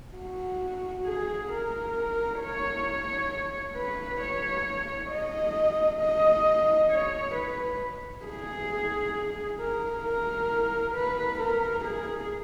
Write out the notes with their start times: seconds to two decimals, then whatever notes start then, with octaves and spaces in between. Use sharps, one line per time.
0.16 F#4
1.06 G#4
1.52 A#4
2.41 C#5
3.76 B4
4.21 C#5
5.11 D#5
6.00 D#5
6.91 C#5
7.35 B4
8.26 G#4
9.60 A#4
10.05 A#4
10.95 B4
11.40 A#4
11.85 G#4